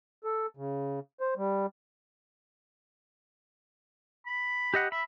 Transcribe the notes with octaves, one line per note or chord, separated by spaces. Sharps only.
A4
C#3
C5
G3
B5
G4 D#5 F#5
E5 B5